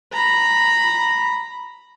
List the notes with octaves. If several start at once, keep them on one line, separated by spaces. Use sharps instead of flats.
A#5 B5